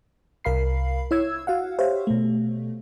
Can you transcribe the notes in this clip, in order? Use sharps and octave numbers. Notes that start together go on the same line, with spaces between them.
C2 A#4 F5 B5 C7
E4 C#5 E6 G#6
F#4 F5 F#5
G4 C5 C#5 E5 F5
B2 A3